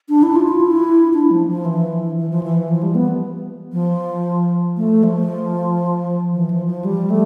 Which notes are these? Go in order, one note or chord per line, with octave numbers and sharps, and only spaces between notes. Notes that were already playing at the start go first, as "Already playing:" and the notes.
D4
E4
F4
F4
E4
D4
F3
F3
E3
E3
F3
E3
F3
G3
B3
F3
A3
F3
E3
F3
F3
G3
A3